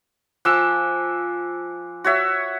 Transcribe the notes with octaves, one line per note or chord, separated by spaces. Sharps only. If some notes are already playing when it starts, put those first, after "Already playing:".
F3 G#5 D6 E6 F#6
F#4 C#5 E5